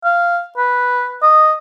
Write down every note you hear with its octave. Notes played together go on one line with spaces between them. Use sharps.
F5
B4
D#5